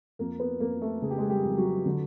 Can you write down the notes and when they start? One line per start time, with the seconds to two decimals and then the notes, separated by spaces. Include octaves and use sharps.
0.19 F2 A#3 A#4
0.39 B3 B4
0.60 F2 A#3 A#4
0.81 A3 A4
1.02 C#3 G#4
1.10 G4
1.18 G#3 G#4
1.30 G3 G4
1.44 F2
1.57 F#3 F#4
1.86 D3